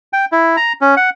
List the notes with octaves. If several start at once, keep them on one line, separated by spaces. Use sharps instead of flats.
G5
E4
A#5
C#4
F#5